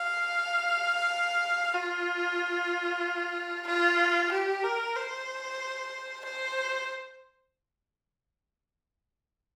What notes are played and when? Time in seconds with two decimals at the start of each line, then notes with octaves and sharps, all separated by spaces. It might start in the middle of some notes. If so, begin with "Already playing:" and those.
Already playing: F5
1.74 F4
3.67 F4
4.31 G4
4.64 A#4
4.96 C5
6.25 C5